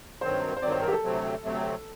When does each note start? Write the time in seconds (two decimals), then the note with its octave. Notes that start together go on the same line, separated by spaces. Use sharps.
0.21 G2 D#3 F#3 C4 C5
0.57 C5
0.62 G2 D#3 F#3 C4 D5
0.72 C5
0.82 A#4
0.88 G4
0.93 A4
1.03 D2 C3 F#3 A3 C4
1.42 D2 C3 F#3 A3 C4